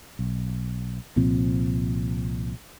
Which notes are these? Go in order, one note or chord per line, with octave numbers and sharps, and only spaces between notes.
B1
C2 A#2 F3 C4